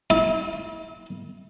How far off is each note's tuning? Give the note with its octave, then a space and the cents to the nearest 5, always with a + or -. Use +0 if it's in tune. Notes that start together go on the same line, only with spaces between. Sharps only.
E4 -35